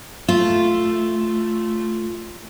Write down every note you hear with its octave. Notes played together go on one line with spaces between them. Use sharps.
A3 F4